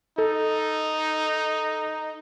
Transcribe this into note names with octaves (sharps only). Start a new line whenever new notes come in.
D#4 A4